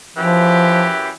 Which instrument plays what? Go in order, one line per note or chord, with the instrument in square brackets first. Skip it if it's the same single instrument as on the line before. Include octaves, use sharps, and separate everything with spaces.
[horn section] F#2 E3 G4 [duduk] F3